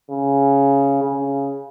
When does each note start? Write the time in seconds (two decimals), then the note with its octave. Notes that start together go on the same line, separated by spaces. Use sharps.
0.11 C#3
1.03 C#3